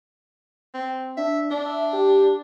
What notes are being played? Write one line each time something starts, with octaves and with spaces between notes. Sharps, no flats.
C4
D4 E5
D4 D5
E5
G4